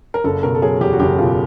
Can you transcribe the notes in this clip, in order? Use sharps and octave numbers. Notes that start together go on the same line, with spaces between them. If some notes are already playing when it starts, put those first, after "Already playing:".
A#4
F#1 A4
B2 A#4
A4
F#3 G#4
E2 G4
F#4
F#1 G4
B2 F4